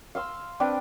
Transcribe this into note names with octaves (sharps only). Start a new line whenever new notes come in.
F5 C6 E6
C4 D4 B4 G5